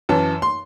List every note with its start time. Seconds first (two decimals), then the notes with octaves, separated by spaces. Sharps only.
0.09 F#2 E3 A5
0.42 C6